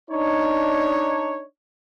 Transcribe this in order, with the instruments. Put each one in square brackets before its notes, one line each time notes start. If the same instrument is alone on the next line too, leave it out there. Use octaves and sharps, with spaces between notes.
[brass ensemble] D4 D#4 C#5